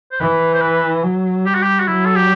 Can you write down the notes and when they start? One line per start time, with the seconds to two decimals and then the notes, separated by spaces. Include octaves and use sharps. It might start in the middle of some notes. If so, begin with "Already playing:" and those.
0.12 C5
0.20 E3 B4
0.54 C5
0.62 B4
1.03 F#3
1.45 G3 G4
1.55 F#4
1.63 G4
1.80 F#4
1.87 F#3 E4
2.06 A4
2.16 G4